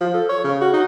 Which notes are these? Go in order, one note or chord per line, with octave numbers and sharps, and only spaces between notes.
F3
A4
C#5
C#3
F#4
D#4